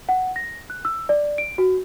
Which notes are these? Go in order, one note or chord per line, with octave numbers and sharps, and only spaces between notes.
F#5
A#6
F#6
E6
D5
D7
F#4